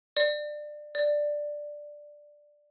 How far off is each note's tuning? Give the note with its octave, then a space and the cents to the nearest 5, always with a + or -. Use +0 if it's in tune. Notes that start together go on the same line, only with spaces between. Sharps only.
D5 +20
D5 +5